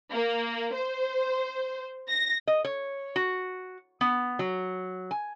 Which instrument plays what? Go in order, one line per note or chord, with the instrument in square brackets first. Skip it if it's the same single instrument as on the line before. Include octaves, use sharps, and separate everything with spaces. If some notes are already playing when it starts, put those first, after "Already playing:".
[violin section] A#3
C5
A#6
[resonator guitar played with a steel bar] D#5
C#5
F#4
B3
F#3
G#5